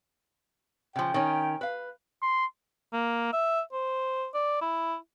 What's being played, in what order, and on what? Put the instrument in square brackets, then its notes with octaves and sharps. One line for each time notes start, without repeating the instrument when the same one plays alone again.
[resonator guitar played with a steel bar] C#3 F3 [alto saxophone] G5
[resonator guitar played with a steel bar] D#3 C#4
B4 F5
[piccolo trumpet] C6
[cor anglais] A#3
E5
C5
D5
E4